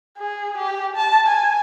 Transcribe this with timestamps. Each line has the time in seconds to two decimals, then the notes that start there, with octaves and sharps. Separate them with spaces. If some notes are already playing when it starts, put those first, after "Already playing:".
0.18 G#4
0.57 G4
0.96 A5
1.27 G#5